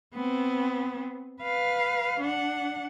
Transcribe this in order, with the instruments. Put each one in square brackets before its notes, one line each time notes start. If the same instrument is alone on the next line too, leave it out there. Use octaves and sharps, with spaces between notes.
[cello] B3 C4
B4 F5
D4 F#5